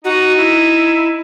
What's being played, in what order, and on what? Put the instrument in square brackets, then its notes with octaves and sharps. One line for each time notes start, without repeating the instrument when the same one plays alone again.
[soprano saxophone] D#4 [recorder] F#4
[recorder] E4